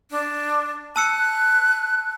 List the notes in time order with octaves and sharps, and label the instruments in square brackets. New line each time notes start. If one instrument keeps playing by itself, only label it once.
[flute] D4
[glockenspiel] A5 E6 C#7 [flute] F#6